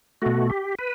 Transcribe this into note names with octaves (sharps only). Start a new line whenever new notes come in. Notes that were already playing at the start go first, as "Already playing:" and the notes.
B2 A3 F#4
G4
B4